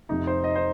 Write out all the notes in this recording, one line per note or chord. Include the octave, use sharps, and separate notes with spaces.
F1 F2 C3 D#4
C5
D#5
C5